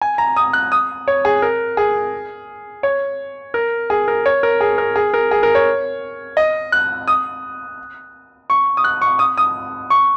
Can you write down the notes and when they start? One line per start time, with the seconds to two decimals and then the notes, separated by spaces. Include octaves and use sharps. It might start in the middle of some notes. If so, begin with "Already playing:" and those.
0.01 G#5
0.18 A#5
0.36 D#6
0.53 F#6
0.72 D#6
1.08 C#5
1.25 G#4
1.42 A#4
1.77 G#4
2.83 C#5
3.54 A#4
3.90 G#4
4.08 A#4
4.26 C#5
4.43 A#4
4.61 G#4
4.78 A#4
4.96 G#4
5.14 A#4
5.31 G#4
5.43 A#4
5.55 C#5
6.37 D#5
6.72 F#6
7.08 D#6
8.50 C#6
8.77 D#6
8.84 F#6
9.02 C#6
9.19 D#6
9.38 D#6
9.90 C#6